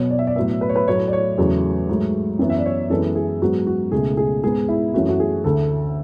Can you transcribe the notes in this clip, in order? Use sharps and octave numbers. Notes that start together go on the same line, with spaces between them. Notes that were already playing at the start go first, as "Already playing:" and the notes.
Already playing: B2 F#3 B3 C#5
D5
E5
D5
A2 F#3 B3 E5
B4
C#5
B4
A2 F#3 A3 C#5
D5
C#5
E2 C#3 F#3 A3
G#2 F#3 A3
F#2 E3 B3
E5
D5
C#5
F#2 E3 G#3 B3 A4
G#4
G#2 F#3 B3 F#4
F#4
C#2 B2 A3 G#4
G#4
G#2 G#3 B3 G#4
E4
F#2 E3 A3 F#4
F#4
G#4
D2 D3 A3 A4